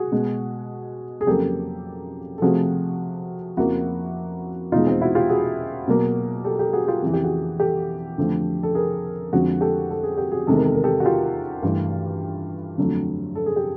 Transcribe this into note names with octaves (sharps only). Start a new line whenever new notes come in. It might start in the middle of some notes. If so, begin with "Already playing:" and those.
Already playing: F#4 G#4
B2 G#3
G#4
F2 C#3 F#3 A#3 G4 A4
A4
C3 F3 A3 F#4 G#4
F2 C#3 F3 A#3 E4 F#4
E2 B2 G#3 D#4 F4
C4
E4 F#4
F4 G4
F#4 G#4
B2 F#3 A#3
G4 A4
G4 A4
F#4 G#4
F4 G4
F2 C#3 E3 G#4
G4
F#4 G#4
G4 A4
F2 D3 F3 A3
A4
G#4 A#4
F2 D3 F3 G#3 F#4 G#4
G4 A4
A4
G#4
G4
F#4 G#4
E2 C3 D#3 G#3 A4
A#4
A4
A#4
G4 A4
F#4
F4 G4
G2 E3 A3
F2 D3 F#3 A3
A4
G#4
G4